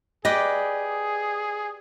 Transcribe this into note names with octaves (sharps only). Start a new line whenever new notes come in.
G4 G#4 B4 D5 D#5